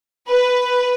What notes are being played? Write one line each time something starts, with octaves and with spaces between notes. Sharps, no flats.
B4